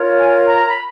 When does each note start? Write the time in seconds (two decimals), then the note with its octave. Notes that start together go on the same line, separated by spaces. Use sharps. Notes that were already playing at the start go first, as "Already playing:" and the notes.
Already playing: F4 A#4 C#5
0.19 G#5
0.48 A#5
0.61 A#5
0.69 B5